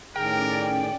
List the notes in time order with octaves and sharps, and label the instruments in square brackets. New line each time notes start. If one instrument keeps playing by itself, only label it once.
[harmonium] A2 D#3 G#4 [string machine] C#4 D5 [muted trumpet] A#4 [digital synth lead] G5